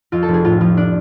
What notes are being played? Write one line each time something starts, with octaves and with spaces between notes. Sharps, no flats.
F2 F4
A4
F1
G#4
A2 F4
F3 F4
D4